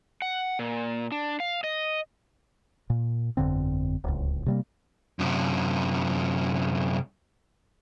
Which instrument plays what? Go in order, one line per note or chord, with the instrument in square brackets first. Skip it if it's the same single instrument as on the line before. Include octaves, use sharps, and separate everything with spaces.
[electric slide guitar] F#5
A#2
D4
F5
D#5
[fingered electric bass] A#2
G1 F2 D3 C4
D1 C#2
C3 G3 A#3
[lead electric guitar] F#2 C3